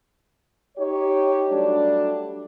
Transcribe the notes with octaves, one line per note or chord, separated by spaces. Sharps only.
D#4 G4 C#5
F#3 G3 A3 D4